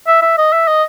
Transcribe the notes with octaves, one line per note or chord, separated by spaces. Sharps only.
E5
E5
D#5
E5
D#5